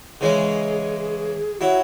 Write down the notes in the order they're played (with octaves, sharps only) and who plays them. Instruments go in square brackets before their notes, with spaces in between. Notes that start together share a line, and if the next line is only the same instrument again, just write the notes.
[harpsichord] C#3 E3 G#3 C#4 [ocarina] G#4
[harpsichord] F#3 E4 [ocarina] F#4